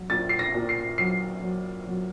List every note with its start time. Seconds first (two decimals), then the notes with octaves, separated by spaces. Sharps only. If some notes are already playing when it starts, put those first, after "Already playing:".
Already playing: F#3
0.10 A#2 A6
0.29 C7
0.39 A#6
0.54 A#2
0.69 C7
0.98 F#3 C7
1.42 F#3
1.87 F#3